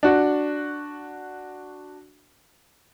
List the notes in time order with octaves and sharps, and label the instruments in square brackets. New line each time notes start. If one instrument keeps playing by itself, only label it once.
[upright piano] D4 F#4